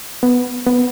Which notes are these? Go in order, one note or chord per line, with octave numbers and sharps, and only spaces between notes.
B3
B3